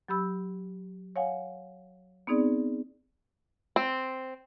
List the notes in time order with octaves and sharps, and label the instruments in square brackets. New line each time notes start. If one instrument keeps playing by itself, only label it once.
[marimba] F#3 G4 B5 E6
C#5 F5 F#5 G#5
B3 C4 D#4 G#4 D5
[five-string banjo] C4